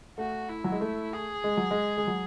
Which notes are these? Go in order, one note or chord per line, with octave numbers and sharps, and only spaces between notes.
A3 F#4
E4
F#3
G#3
A3
G#4
G#3
F#3
G#3
G#3
F#3